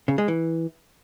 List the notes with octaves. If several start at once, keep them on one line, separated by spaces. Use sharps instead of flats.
C#3
G#3
E3